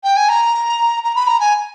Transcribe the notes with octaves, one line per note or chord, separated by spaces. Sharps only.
G5
G#5
A#5
A#5
B5
A#5
G#5